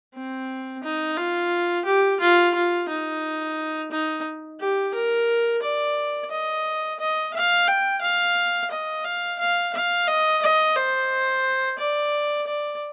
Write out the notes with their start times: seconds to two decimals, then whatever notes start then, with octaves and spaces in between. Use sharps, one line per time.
0.15 C4
0.83 D#4
1.17 F4
1.85 G4
2.20 F4
2.54 F4
2.88 D#4
3.91 D#4
4.60 G4
4.94 A#4
5.62 D5
6.31 D#5
6.99 D#5
7.34 F5
7.68 G5
8.02 F5
8.70 D#5
9.05 F5
9.39 F5
9.73 F5
10.07 D#5
10.42 D#5
10.76 C5
11.79 D5
12.47 D5